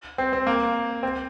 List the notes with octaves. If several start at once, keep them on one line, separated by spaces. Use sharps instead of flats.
C4
C4
A#3
C4